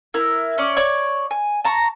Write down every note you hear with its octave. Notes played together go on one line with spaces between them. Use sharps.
E4 A#4
C#4 D5
C#5 D5 C#6
G#5
A5 A#5 C#6